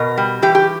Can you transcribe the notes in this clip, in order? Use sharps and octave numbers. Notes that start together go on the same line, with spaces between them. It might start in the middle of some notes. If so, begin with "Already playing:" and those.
Already playing: B2 A#4
G3
E3 G4
G4